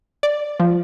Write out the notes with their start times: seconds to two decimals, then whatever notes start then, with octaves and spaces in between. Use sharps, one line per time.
0.23 D5
0.60 F3